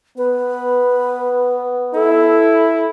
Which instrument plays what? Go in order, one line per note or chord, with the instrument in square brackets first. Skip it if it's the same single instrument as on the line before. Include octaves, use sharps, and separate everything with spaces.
[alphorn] B3 [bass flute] B4
[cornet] E4 [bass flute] A4